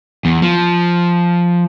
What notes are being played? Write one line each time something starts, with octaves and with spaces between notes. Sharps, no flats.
E2
F3